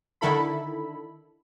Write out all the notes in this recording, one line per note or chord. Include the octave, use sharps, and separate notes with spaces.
D3 D#3 E4 A4 B5